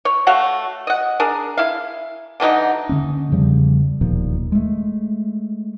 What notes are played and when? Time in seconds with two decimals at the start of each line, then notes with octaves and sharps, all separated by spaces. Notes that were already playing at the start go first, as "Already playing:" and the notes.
0.05 C#5
0.27 A3 F#4 C#5 F5
0.87 D#5 F#5
1.20 D4 G#4 A#4
1.57 E4 F5
2.40 D3 E3 F#3 D#4
2.89 D3 F3 A#3 C#4
3.32 E2 C#3 F3 G3
4.01 E1 D#2 A#2 F3
4.52 G#3 A3